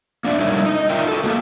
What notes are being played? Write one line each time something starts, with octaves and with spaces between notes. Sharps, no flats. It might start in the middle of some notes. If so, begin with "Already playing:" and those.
A#3 D4 D5 E5
G3 D#4 E4 A#4 C#5 E5
D#4 D#5
F4 A#4 E5 G5
F#4 A4
A3 A#3